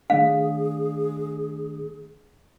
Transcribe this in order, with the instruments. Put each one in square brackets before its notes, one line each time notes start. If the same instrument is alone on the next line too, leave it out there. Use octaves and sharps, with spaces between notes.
[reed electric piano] D#3 A3 D4 [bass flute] G#4 [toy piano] F5